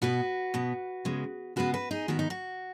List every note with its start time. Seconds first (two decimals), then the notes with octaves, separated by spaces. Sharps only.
0.02 B2 B3 F#4 B4
0.54 B2 B3
1.05 C#3 G#3 B3
1.56 C#3 G#3 B3 F#4 B4
1.74 F#4 B4
1.91 D#4 G#4
2.08 G#2 D#3 B3 F#4
2.19 D#4
2.30 F#4